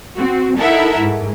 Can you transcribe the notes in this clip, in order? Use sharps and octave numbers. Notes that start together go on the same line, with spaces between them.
C4 F#4
D#4 E4 A4 A#4 E5 F#5
G#2